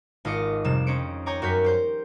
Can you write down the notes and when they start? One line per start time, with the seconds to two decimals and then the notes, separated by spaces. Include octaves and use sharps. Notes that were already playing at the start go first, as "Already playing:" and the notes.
0.25 G#1 F4 D#5 D6 C#7
0.64 F2 C3 G3 E7
0.87 C#4 D#4 C5 C#7 D7
1.26 C#5 G5 G#5 A#5 D6
1.42 F#2 F#4 A#4 C#5 G6 B6
1.64 G4 C5 G6